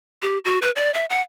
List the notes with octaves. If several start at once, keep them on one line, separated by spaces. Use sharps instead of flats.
G4
F#4
B4
D5
E5
F#5